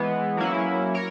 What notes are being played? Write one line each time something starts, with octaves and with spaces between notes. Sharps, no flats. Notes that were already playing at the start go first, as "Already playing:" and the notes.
Already playing: E3 G#3 B3
F#3 A#3 C#4 E4
A#4 C#5